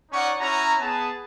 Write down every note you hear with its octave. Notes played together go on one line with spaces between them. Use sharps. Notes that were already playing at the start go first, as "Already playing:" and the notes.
C#4 D#4 C#5 D5 F#5 C#6
C#4 E4 F#4 A#5
B3 G#4 A5